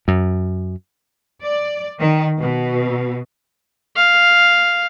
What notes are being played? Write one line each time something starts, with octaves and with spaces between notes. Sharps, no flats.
F#2
D5
D#3
B2
F5